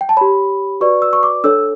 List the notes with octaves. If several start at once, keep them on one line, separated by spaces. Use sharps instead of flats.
G5
A5
G4 C#5 B5
F#4 B4 D5 C#6
E6
C#6
D6
D4 A4 C#5 E6